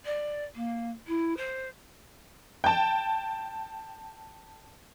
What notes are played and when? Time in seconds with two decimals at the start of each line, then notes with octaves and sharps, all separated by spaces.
0.05 D5
0.55 A#3
1.07 E4
1.37 C5
2.64 G5 A5